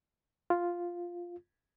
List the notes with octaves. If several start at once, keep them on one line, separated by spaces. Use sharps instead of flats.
F4